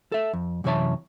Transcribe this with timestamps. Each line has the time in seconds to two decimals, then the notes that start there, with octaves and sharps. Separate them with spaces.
0.12 A4 E5
0.33 F2
0.64 F#2 C3 E3 C#5 E5 A5